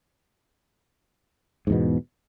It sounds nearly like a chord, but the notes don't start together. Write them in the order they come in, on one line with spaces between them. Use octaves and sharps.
G#2 E2 B2